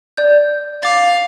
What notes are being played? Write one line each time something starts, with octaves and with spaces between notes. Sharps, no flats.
D5 G6
F5 D6 A6